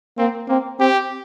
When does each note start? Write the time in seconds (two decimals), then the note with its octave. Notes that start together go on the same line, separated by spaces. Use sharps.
0.18 A#3 C4
0.48 A#3 C4
0.80 C4 G4